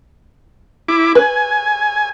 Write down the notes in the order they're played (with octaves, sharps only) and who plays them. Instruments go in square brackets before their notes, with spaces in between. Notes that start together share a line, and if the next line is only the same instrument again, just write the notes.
[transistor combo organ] E4 D6
[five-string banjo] B4 [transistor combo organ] G#5